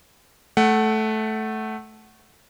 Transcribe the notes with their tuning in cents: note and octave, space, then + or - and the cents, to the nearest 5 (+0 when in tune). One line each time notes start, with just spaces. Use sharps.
A3 -10 F#5 +15